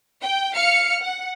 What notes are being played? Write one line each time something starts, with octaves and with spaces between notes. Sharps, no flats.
G5
F5 F6 C#7
F#5